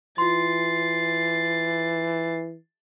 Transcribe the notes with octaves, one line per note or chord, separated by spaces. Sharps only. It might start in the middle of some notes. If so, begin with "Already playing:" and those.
E3 F4 C6 A6 C7